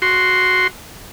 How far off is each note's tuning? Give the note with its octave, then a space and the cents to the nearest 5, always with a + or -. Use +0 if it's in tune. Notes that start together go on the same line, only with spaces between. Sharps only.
F#4 +0 C6 +0